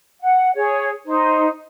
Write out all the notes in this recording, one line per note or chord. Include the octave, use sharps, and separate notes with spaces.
F#5
G#4 C#5
D#4 C5